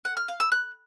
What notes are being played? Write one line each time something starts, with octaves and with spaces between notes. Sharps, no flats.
F#5
F6
F5
E6
F#6